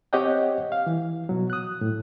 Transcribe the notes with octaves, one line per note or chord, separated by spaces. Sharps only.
C4 G4 C#5 D#5 F#5 G5
F5
E3
B2 F#3
D#6 F#6
A2